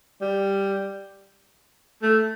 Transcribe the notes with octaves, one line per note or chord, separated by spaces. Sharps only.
G3
A3